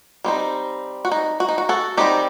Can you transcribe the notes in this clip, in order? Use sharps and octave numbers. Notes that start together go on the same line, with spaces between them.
G3 C4 D#4
F#4
D#4
F#4
D#4
F#4
F#4 A4
D#3 G3 C4 D#4 G4